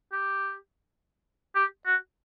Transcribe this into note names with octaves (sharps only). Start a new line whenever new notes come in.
G4
G4
F#4